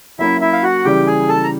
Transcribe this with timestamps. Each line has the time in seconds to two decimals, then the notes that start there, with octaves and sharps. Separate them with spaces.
0.19 F#3 A#3 C#4 E4 E5
0.41 E4 E5
0.53 F5
0.63 F#4 F#5
0.85 C#3 E3 G3 G4 G5
1.07 G#4 G#5
1.29 A4 A5
1.43 A#5